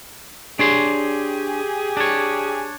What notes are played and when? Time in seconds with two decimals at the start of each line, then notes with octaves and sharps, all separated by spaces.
0.59 D4 G4 G#4 C#5 C6
1.97 D4 C#5